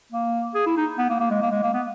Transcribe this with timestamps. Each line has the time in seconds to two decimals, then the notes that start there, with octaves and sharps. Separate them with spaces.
0.12 A#3
0.55 G#4
0.66 E4
0.77 D#4
0.98 B3
1.10 A#3
1.20 A#3
1.31 G#3
1.42 A#3
1.52 G#3
1.63 A#3
1.74 B3